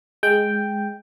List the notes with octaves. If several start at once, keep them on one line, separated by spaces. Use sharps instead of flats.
G#3 G5